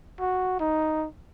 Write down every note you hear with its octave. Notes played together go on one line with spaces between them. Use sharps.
F#4
D#4